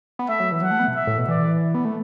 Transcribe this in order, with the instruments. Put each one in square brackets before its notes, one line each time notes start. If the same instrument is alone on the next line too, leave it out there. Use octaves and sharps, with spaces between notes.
[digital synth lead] B3
[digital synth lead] A3 [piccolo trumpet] E5
[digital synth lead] F#3
E3
[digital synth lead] F#3 [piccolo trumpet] F#5
[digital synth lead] A3
B3
B2
[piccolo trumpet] E5
[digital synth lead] A2
B2
[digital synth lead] E3 [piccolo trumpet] D5
[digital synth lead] B3
A3